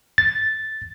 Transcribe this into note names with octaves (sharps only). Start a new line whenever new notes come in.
A6